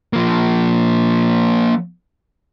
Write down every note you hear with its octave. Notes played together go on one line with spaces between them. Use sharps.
F3 A#3